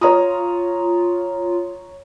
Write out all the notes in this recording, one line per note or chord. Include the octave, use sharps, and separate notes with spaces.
F4 C#5 A#5 D#6